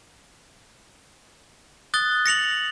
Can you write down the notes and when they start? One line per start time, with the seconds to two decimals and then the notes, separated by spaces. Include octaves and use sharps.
1.94 D#6 F#6 A6 G7
2.26 A#6 C#7 F7 F#7